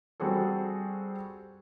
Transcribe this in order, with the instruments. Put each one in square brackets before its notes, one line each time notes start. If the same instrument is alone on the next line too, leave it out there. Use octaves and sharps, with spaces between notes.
[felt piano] G3 C4 F#4 G#4 A4